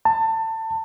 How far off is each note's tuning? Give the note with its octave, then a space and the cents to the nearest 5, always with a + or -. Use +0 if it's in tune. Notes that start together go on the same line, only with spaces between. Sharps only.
A5 +25